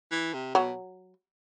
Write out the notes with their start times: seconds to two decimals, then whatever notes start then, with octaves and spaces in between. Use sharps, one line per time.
0.11 E3
0.33 C3
0.55 B2 F#3